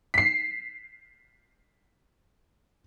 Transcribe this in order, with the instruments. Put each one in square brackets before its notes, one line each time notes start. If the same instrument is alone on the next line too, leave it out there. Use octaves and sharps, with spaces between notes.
[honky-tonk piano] B6 C7